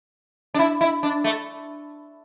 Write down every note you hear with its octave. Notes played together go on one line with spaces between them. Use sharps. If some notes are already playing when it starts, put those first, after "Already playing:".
D4
E4
E4
D4
A3